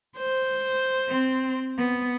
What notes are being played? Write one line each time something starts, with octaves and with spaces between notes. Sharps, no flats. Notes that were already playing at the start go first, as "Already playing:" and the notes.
C5
C4
B3